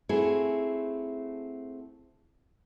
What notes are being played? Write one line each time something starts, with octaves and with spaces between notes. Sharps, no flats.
A3 C4 E4 F#4 G#4